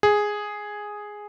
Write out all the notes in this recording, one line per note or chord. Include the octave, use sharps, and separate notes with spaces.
G#4